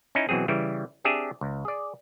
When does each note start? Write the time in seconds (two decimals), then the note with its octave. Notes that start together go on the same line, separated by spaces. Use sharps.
0.15 C#4 D#4 E4
0.29 B2 E3 F#3 C4 G#4
0.48 C#3 E3 G3 E4
1.04 C4 D4 G4 G#4 E5
1.41 C#2
1.65 G#4 D5